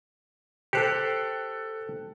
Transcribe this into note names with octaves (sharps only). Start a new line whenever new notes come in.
G4 A4 C5 F#6 C#7